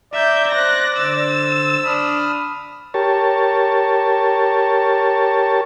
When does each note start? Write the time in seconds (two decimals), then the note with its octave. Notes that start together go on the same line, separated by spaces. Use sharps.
0.13 D5 E5 A#5 G6
0.52 C5 D6 F#6 A#6
0.97 D3 C5 E6 A6
1.84 D4 B5 D#6 F6
2.94 G4 A#4 C#5 A5